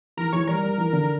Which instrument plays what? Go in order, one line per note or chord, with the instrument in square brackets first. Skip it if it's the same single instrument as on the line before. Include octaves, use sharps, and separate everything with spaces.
[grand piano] E3 [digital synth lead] A#4
[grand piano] E3 [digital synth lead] C#5
[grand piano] G3 [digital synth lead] A#4
[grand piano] G3
E3
D3